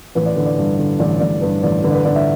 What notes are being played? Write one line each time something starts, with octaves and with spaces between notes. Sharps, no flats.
A1 B4
D5
D3 B4
D5
G2
D3
A1 D5
A1 D5
G2 B4
A1 D5
D3 B4
D5
B4
D3 D5
E5